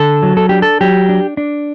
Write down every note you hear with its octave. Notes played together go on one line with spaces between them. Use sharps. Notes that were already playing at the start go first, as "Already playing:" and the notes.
Already playing: D3 A4
F#3
A4
D4 G4
A4
F#3 G4
D4
D4